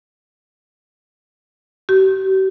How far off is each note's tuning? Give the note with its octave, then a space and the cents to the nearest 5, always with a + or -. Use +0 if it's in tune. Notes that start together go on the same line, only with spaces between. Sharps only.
G4 -45